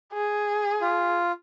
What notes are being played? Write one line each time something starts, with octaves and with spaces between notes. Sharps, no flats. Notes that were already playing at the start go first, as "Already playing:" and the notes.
G#4
F4